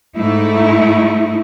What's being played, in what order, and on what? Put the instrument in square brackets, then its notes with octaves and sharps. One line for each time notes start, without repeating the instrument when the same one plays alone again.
[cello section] G#2 A3 D#4 E4